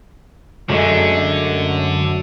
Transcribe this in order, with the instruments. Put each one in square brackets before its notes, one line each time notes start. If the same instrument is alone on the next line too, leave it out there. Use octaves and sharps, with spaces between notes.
[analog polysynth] F#2 [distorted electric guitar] D3 [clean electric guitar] G#3 A3 D4